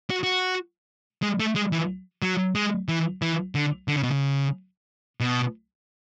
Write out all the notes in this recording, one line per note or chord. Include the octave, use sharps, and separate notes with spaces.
F#4
F#4
G#3
A3
G#3
E3
F#3
G#3
E3
E3
D3
D3
C#3
B2
C#3
B2